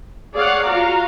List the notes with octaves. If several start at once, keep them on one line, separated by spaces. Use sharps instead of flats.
G#4 C#5 D5 F5 F#5
F4 F#4 F5 A#5